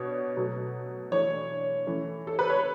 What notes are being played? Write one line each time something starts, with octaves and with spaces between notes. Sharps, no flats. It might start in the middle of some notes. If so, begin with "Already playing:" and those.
Already playing: B2 D4 C#5
B2 F#3 A3
E3 A3 D4 C#5
E3 A3 C#4
A4
B4
C#5